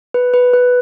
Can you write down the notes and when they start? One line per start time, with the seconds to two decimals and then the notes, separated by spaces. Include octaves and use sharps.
0.14 B4
0.34 B4
0.53 B4